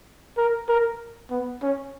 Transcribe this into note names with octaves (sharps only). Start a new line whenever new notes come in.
A#4
A#4
B3
C#4